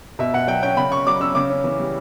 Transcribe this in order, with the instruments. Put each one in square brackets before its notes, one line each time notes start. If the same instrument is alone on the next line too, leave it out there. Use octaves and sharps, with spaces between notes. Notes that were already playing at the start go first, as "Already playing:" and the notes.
[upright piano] B2 E5
B2 F#5
F#3 G5
C#4 G5
C#3 B5
C#3 C#6
F#3 D6
C#4 E6
C#3 D6
C#4
E3
G3